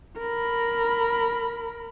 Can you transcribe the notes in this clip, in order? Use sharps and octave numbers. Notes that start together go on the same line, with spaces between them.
A#4 B5